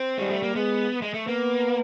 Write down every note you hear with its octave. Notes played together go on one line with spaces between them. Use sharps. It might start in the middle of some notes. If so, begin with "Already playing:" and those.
Already playing: C4
G3 G#3
A3
A#3
G#3 B3
G#3
A3
A#3 B3